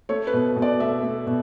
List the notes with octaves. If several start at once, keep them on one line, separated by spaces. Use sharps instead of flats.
A3 C#5
B4
B2
B2
D5
A3 E5
A3
B2